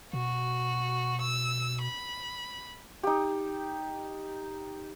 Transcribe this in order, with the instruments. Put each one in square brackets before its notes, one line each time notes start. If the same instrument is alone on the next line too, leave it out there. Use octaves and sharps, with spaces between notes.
[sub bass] B2 [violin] F#4
[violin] E6
B5
[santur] D#4 G4